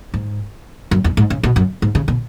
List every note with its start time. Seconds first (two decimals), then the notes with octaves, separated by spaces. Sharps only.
0.14 G#2
0.91 F#2
1.04 E2
1.17 G#2
1.30 C#3
1.43 B2
1.56 F#2
1.82 G#2
1.95 C#3
2.08 B2